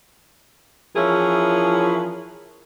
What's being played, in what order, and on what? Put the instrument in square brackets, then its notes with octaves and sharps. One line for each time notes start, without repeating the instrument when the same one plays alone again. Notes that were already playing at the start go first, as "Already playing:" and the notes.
[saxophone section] E3 F3 C#4 E4 G#4 A#4